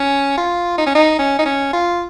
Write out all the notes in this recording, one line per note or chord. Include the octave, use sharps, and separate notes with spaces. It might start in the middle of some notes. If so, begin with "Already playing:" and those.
Already playing: C#4
F4
D#4
C#4
D#4
C#4
D#4
C#4
F4